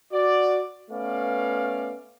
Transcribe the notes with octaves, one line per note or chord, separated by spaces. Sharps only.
F#4 D5
A3 B3 C#4 B4 D5 F5